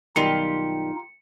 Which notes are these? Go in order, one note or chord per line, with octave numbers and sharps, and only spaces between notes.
B1 D#3 G3 D#4 F4 G4 C#7